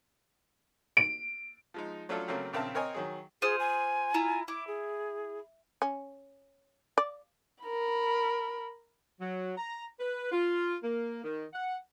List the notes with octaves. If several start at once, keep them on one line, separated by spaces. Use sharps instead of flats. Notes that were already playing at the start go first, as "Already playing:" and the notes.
D7
F3 G#3 D#4
F#3 A3 C#4 D4 F4 A4
C#3 F#3 A3 A#3 C4
A#1 C#3 C4 A#4 E5 A5
C4 A#4 C#5 D#5 G#5
D#3 F#3 G#4
F4 G#4 C5 D#6
G#5
E4 F4 A#5
E4 D6
G#4
C#4
D5
A#4 B5
F#3
A#5
B4
F4
A#3
D#3
F#5